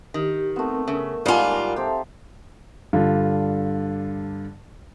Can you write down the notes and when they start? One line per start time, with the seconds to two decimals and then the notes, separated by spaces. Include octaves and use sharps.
0.14 D#3 G4
0.56 A3 B3 C4 A#4
0.88 C#3 A#4 E5
1.26 G#2 G3 D#4 F4 F5 F#5 G#5 A5
1.51 A#5
1.76 C4 G4 A4 E5 A5
2.93 G2 D3 F4